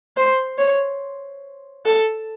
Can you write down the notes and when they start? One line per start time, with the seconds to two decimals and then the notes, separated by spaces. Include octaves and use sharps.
0.17 C5
0.58 C#5
1.85 A4